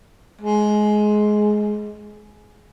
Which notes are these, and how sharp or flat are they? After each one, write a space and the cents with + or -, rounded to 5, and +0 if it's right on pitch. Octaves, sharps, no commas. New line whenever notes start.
G#3 +15